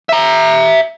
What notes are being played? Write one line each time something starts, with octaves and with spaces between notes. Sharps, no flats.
E5 A#5